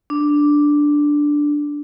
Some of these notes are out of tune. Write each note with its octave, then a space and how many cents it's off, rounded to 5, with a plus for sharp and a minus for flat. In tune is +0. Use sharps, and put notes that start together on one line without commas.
D4 +0